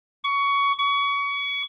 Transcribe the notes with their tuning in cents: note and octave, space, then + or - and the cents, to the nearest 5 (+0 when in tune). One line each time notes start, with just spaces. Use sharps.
C#6 +20
C#6 +30